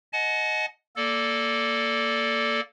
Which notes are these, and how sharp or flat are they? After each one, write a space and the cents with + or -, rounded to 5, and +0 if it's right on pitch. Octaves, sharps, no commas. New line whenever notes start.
D#5 +0 F#5 +0 A5 -45
A#3 +0 A4 +0 D5 -10